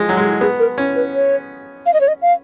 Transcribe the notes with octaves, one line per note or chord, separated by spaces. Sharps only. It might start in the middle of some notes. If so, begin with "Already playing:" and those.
Already playing: F3 G#3
F#3
G#3
B3 G#4
A#4
C#4
B4
C#5
F5
D#5
C#5
D#5
F5